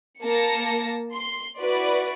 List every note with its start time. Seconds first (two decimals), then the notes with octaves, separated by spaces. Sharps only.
0.23 A#3 A5 A#6 C#7
1.14 C6
1.60 E4 F#4 B4 D5